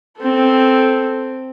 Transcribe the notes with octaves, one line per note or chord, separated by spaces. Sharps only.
C4 A4